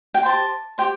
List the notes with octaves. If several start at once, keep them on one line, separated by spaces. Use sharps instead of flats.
G5
G4 C5 A5
G4 C5 G5